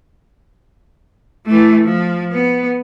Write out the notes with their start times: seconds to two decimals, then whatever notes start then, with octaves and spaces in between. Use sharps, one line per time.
1.46 E3 A3
1.84 F3
2.31 B3